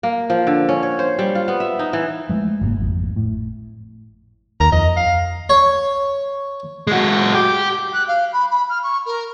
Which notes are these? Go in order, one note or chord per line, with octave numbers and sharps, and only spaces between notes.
A#3
F3
D3
C#4
C#5
C5
G3
F4
B3
E5
D#4
E3
F3 G#3 A3
F#1 G#2 A#3
G#1 F2
A2
D#2 A#5
F2 D#5
F5
C#5
G#3 F#4
G4
F#6
F5
B5
B5
F6
C#6
A#4